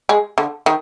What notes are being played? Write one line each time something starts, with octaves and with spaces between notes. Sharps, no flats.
G#3
D3
D#3